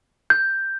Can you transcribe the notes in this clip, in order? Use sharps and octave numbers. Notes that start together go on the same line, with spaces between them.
G6